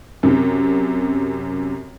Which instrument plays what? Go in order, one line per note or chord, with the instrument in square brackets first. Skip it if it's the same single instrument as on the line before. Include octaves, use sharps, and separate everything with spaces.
[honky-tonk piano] F#2 C3